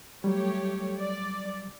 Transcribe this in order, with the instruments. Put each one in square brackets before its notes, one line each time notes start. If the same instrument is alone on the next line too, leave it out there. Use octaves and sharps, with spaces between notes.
[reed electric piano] F#3 G3 [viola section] A3 G4 C#5
[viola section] D5